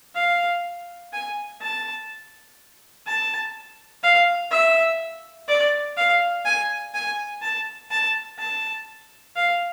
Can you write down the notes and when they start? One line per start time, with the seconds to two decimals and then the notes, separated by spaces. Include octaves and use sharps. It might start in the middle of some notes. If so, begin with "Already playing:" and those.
0.15 F5
1.13 G#5
1.61 A5
3.06 A5
4.03 F5
4.51 E5
5.48 D5
5.97 F5
6.45 G#5
6.94 G#5
7.42 A5
7.91 A5
8.39 A5
9.36 F5